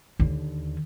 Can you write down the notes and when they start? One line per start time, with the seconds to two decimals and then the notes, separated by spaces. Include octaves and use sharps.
0.20 D#2 D3